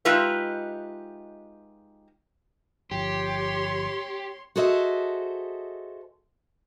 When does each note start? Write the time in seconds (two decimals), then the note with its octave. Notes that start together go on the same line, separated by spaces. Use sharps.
0.05 G#3 D#4 F4 G4 B4 E5
2.91 G1 F3 G4 C#5 C6
4.56 F#4 G#4 A4 C5 D#5 E5